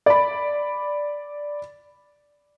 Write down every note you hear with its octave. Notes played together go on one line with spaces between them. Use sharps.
D5 B5